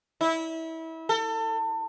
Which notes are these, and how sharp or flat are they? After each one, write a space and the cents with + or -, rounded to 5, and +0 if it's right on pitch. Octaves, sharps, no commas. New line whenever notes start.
E4 -25
A4 +30